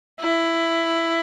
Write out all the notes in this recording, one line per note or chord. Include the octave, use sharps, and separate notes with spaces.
E4